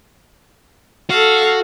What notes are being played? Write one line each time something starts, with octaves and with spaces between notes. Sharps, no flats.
F#4 A4 F5